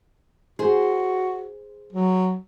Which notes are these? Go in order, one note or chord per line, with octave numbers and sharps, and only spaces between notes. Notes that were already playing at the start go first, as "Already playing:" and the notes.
F#4 G#4 C5
F#3